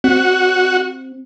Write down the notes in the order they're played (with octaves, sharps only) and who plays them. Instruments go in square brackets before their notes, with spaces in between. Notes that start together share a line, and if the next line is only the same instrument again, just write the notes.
[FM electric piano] C4 [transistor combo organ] F#4